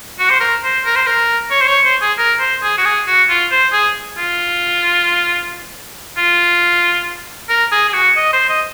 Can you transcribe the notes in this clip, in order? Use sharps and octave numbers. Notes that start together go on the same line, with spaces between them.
F#4
C5
A#4
C5
A#4
C5
A#4
C#5
C5
C#5
C5
G#4
A#4
C5
G#4
F#4
G#4
F#4
F4
C5
G#4
F4
F4
A#4
G#4
G#4
F#4
D#5
C5
D#5